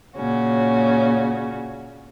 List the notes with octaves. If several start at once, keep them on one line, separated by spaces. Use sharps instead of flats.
A#2 C#3 C#4 F#4